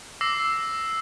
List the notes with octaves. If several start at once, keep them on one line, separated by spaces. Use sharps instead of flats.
D6 E6 A#6 C7